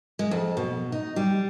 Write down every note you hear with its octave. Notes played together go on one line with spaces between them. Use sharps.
G#3
F2
B2
D#4
G3